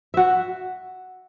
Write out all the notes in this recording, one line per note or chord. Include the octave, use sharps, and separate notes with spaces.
F#4 E5